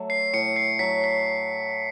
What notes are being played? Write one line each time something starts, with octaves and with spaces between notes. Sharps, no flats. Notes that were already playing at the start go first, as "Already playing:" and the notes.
Already playing: F#3 A3
C7
A2 C#7
C7
F#3 B6
B6